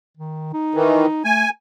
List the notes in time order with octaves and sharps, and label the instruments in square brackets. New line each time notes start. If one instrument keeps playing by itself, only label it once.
[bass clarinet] D#3
D#4
[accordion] D#3 E3
[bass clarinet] A3 [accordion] G#5